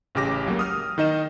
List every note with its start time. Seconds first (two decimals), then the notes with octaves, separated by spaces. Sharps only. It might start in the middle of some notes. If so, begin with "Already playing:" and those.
0.15 A1 C#3 G4 D6 A#6
0.46 C#2 F#3 A#3
0.59 D#6 F6
0.98 D#3 D#4 D#5 E7